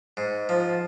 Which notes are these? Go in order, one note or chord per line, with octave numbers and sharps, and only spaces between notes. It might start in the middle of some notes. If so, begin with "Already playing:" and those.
G#2
F3